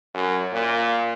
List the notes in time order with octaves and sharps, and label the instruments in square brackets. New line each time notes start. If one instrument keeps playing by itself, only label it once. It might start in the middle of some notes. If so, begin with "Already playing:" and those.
[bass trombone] F#2
A#2